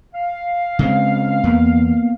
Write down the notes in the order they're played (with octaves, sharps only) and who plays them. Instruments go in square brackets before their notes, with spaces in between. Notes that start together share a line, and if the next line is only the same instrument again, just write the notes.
[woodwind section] F5
[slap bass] C#3 G#3 C4
[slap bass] E2 [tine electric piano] A#3 B3